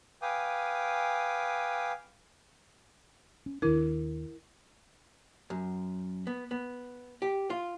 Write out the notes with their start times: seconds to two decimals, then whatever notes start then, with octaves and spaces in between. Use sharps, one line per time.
0.22 B4 F5 G5 G#5 D6 D#6
3.46 C#4
3.62 D#2 D#3 D4 E4 A#4
5.50 F#2
6.27 B3
6.51 B3
7.22 G4
7.50 F4